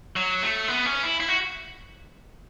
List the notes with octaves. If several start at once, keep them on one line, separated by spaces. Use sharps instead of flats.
F#3
A3
B3
C#4
E4
E4
F#4